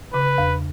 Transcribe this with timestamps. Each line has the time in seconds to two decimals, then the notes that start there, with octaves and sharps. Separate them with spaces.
0.14 C#3 B4
0.38 E2